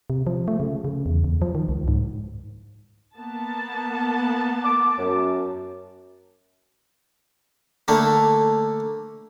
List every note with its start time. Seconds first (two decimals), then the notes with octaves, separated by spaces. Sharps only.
0.10 C3
0.27 F3
0.48 A3
0.60 C#3
0.85 C#3
1.06 E2
1.24 E2
1.42 F3
1.55 D#3
1.69 C#2
1.88 G#2
3.16 A#3 B3 A5
4.64 D6
4.98 F#2
7.88 D3 A3 A#3